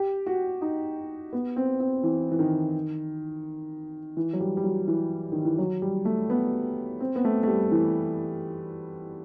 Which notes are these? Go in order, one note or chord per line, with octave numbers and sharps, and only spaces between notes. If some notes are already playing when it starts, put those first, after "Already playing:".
Already playing: G4
F#4
D#4
B3
C4
C4
E3
E3
D#3
E3
F#3
G3
G3
F#3
E3
D#3
E3
F#3
G3
A3
B3
C4
B3
A3
A3
G3
E3